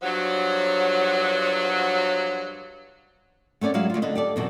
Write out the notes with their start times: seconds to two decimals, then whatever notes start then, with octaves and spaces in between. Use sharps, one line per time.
0.02 G2 F3 F#3
3.61 A3 B3 C#4 D5
3.74 F#3 G#3 E4 F5
3.90 D2 F4
4.02 D3 B4 D#5
4.15 G4 A4 D5
4.36 F#2 B2 E3